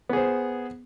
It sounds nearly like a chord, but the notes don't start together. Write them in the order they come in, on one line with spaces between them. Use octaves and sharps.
B3 G#4 C5